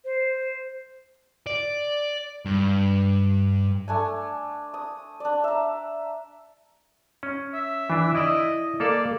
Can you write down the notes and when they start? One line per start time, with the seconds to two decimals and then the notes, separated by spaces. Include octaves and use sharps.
0.05 C5
1.47 D5
2.45 G2
3.88 A3 D4 G#5
4.74 D#6
5.20 D4 D5
5.44 E5 A#5
7.23 C#4
7.54 E5
7.90 E3 D4
8.15 E4 D5 D#5
8.80 A#3 A4 D5 F5